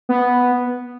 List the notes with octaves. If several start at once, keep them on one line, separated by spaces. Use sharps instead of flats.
B3